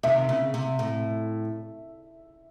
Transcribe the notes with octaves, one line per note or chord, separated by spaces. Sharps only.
C3 D#3 E5
C#3
C3
A2